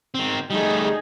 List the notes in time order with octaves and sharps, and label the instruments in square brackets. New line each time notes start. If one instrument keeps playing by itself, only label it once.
[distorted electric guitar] D#3 C4
[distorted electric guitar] G3 A3 [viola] D#4 G#4